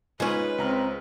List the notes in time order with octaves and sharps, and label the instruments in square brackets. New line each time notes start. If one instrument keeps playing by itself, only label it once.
[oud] G#3 C#4 [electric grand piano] D#4 F4 [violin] B4
[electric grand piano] C#2 A#5 F6 [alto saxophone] C4